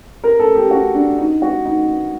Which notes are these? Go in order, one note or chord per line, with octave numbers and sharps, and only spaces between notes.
A#4
A4
G4
F#4
D4
D#4
F#4
D#4